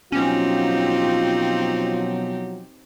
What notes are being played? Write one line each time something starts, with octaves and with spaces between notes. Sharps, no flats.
B2 F3 F#3 C4 C#4 D#4 F4 G4